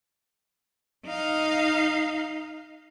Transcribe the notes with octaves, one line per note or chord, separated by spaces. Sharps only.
D#4 F5